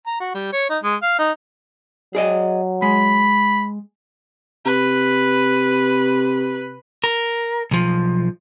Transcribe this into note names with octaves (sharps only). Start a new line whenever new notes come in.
A#5
F#4
G3
C#5
D#4
G#3
F5
D#4
F#3 G#4 D5 D#5
G#3 B5
C3 B4
A#4
B1 F3